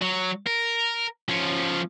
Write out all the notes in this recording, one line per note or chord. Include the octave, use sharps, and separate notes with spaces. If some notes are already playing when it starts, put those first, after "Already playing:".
F#3
A#4
F3 C#4